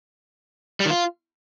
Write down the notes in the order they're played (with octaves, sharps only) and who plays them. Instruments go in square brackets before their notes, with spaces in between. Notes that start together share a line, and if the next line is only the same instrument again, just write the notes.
[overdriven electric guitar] G3
D#3
F4